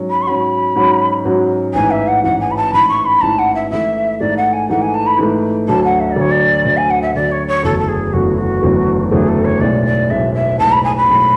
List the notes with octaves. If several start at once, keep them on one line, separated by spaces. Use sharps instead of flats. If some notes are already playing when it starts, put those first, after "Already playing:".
Already playing: G#2 F#3 C#4 F#4
B5
C#6
G#2 F#3 C#4 F#4 B5
G#2 F#3 C#4 F#4
G#2 F#3 C#4 F#4
A1 G#2 E3 G#5
E5
F#5
A1 G#2 E3 F#5
G#5
B5
A5
A1 G#2 E3 B5
C#6
B5
A1 G#2 E3 A5
F#5
E5
G#2 E3 A3 E5
G#2 E3 A3 D5
F#5
G#5
G#2 E3 A3 F#5
G#5
A5
B5
G#2 E3 A3
D2 D3 F#3 A5
F#5
E5
D5
D2 D3 F#3 C#5
D5
D2 D3 F#3
G#5
F#5
E5
D2 D3 F#3 D5
C#5
C#5
F#1 E2 D3 F#3 A3 A4
A4
G#4
F#1 E2 D3 F#3 A3 F#4
E4
F#4
F#1 E2 D3 F#3 A3
F#1 E2 D3 F#3 A3 G#4
A4
C#5
B1 A2 G#3 D5
D5
B1 A2 G#3 E5
E5
B1 A2 G#3 A5
B5
G#5
B5
B1 A2 G#3